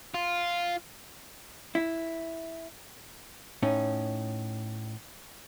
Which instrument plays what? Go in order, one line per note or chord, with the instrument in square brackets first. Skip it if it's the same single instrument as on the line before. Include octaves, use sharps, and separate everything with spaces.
[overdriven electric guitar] F4
[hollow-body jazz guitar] E4
A2 C#4 D#4